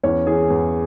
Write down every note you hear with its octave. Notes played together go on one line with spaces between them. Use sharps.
E2 C#4 C#5
E3 G#4 G#5
E2